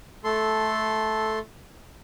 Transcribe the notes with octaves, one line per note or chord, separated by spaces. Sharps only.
A3 A4 C6